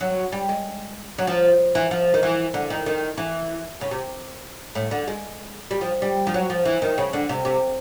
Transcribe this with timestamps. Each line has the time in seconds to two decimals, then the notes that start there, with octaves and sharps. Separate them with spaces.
0.01 F#3
0.32 G3
0.49 G#3
1.18 F#3
1.27 F3
1.75 E3
1.91 F3
2.14 D#3
2.23 E3
2.54 D3
2.70 D#3
2.86 D#3
3.18 E3
3.81 C#3
3.91 C3
4.75 A2
4.91 D3
5.07 G#3
5.71 G3
5.81 F3
6.02 G3
6.27 F3
6.34 F#3
6.50 F3
6.65 E3
6.82 D#3
6.98 C#3
7.13 D3
7.29 C3
7.45 C3